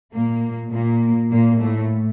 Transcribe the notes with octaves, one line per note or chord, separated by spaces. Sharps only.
A#2 A#3
A#2 A#3
A#2 A#3
A2 A3